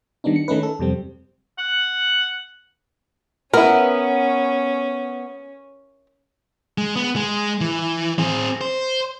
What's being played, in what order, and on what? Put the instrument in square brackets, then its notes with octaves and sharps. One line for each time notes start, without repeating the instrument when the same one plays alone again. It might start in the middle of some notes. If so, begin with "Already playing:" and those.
[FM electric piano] D#3 G3 B3 D4 D#4
C#7
D#3 A3 C#4 D#4 B4
A4
F2 C3 G3 C4
[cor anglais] F#5
[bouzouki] B3 [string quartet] C#4 [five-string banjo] E4 A#4
[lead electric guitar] G#3
B3
G#3
E3
C4 G#4
C5